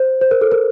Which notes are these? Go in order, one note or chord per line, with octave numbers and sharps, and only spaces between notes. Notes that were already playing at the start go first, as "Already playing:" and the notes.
Already playing: C5
C5
A#4
A4
A#4